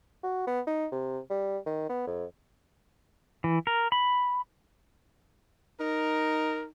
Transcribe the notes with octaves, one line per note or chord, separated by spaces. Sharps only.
F#4
B3
D#4
C3
G3
D#3
B3
F2
E3
A#4
B5
D#4 A#4